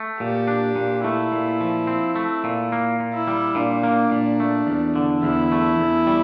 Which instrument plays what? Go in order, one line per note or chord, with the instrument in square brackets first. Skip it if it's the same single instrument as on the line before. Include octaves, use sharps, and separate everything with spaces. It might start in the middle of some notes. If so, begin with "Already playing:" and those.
Already playing: [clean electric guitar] A3
[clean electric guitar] A#2 [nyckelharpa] G4
[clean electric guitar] D4
A#2
[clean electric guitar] A3 [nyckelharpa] E4
[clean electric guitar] A#2
F3
C4
A3
A#2
A#3
A#2
[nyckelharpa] E4
[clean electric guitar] G3
[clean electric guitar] A#2 [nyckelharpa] D4
[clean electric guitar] A#3
A#2
A3
E2
D3
[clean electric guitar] E2 [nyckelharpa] E4
[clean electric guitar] A3
E2
G3